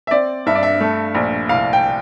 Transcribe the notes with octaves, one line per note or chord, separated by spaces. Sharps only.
E5
C4 D5
G2 E5
D5
E5
A3
A#1
C2 F5
G5